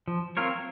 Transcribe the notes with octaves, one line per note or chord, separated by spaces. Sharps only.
F3
C4 F4 A#4 C#5